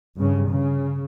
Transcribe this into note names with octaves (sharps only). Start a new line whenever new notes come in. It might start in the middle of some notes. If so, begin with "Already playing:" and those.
G2 C#3
C#3